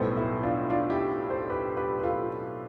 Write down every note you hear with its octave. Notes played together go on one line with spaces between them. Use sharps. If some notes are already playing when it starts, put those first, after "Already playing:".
Already playing: B1 A2 G3 B3 A4 C5
E4
D4 F4
D4 F4
E4 G4
A4 C5
G4 B4
G4 B4
B4
F4 A4